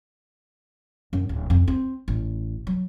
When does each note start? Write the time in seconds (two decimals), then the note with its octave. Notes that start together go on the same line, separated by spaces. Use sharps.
1.13 F#2
1.29 D1
1.50 F2
1.68 C4
2.08 A1
2.67 F#3